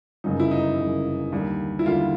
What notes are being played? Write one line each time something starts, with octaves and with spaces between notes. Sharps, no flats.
G1 F#2 C#3 D#4
E4
D#4
G1 F#2 C#3
D#2 D3 G3
E4
D#2 D3 G3 F4